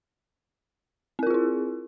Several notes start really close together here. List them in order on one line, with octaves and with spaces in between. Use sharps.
C4 A#4 F4 G#4 E4